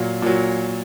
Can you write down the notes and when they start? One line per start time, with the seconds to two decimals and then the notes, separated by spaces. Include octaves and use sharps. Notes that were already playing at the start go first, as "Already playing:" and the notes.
Already playing: A#2 F#3 F5
0.22 A#2 F#3